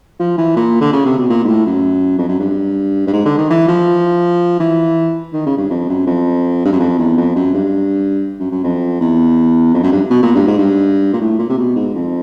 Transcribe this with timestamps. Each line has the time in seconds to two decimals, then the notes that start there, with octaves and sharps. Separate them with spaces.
0.19 F3
0.38 E3
0.56 A#2
0.80 D3
0.93 C#3
1.05 C3
1.17 B2
1.29 A#2
1.44 G#2
1.48 A2
1.66 F#2
2.18 F2
2.28 F#2
2.40 G2
3.07 G2
3.13 G#2
3.25 D3
3.37 D#3
3.50 E3
3.68 F3
4.60 E3
5.33 D#3
5.46 C#3
5.57 G2
5.70 F2
5.88 F#2
6.06 F2
6.65 G2
6.73 F#2
6.80 F2
6.98 E2
7.17 F2
7.36 F#2
7.54 G2
8.39 F#2
8.51 F#2
8.63 F2
9.00 E2
9.74 F2
9.83 F#2
9.92 G2
10.10 B2
10.22 A#2
10.35 G2
10.47 G#2
10.58 G2
11.13 A#2
11.20 A2
11.39 A#2
11.49 C3
11.57 B2
11.76 G#2
11.94 F2